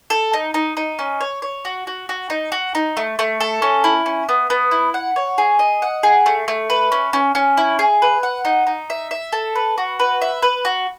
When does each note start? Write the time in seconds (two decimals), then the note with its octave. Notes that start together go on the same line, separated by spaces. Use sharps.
0.10 A4
0.33 D#4
0.54 D#4
0.77 D#4
0.99 C#4
1.21 C#5
1.42 C#5
1.65 F#4
1.87 F#4
2.09 F#4
2.30 D#4
2.52 F#4
2.75 D#4
2.97 A3
3.19 A3
3.40 A4
3.62 C#4
3.84 E4
4.06 C#4
4.29 B3
4.50 B3
4.71 E4
4.94 F#5
5.16 C#5
5.38 G#4
5.59 D#5
5.82 F#5
6.03 G#4
6.26 A3
6.48 A3
6.70 B4
6.92 C#4
7.13 C#4
7.35 C#4
7.57 E4
7.79 G#4
8.02 B4
8.23 F#5
8.45 D#4
8.67 D#4
8.90 E5
9.11 E5
9.33 A4
9.55 B4
9.78 F#4
10.00 B4
10.22 E5
10.42 B4
10.65 F#4